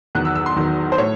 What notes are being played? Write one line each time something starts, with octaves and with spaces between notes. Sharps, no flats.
E2 D#3 F#3 F#6
E6
E6
C6
E2 D#3 F#3
C5
A2 C#5